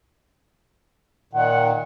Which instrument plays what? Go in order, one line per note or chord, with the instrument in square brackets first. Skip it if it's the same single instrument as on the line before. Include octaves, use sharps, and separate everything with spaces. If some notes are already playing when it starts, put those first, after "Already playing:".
[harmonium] A#2 D#3 [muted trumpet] F#5